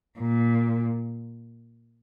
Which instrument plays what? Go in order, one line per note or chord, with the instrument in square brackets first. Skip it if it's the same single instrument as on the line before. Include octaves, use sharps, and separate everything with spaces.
[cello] A#2